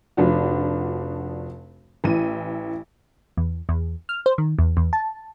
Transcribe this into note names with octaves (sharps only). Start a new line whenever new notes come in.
F1 F3 D4 F#4
A1 E3 D#7
E2
E2
F6
C5
D#3
E2
E2
A5